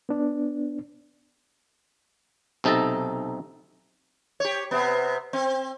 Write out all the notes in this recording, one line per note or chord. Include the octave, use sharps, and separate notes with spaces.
B3 D4
B1 C3 D#4 A4 A5 A#5
G4 C#5
C3 B3
C4